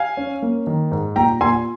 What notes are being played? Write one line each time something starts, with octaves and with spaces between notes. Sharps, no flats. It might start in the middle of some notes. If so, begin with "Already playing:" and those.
Already playing: F5 G#5
C#4
A#3
D#3
G#2
A#2 G5 A#5
A#2 G#5 C6